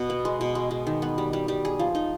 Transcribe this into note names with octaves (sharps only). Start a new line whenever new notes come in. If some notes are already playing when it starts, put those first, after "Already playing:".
Already playing: B2
B3
G#3
B2
G#3
G#3
D#3
B3
G3
G3
G3
G#4
F3
D#4